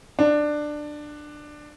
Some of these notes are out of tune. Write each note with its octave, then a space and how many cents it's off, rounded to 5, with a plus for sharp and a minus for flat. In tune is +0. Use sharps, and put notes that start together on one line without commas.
D4 +15